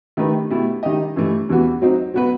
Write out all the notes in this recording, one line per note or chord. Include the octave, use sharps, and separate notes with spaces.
D#3 A3 D#4 G4 B4
B2 A3 E4 G4
D#3 G3 D#4 G4 D#5
G2 E3 A3
E2 C3 E3 B3 F#4
F#3 C4 D#4
F#3 B3 F#4 B4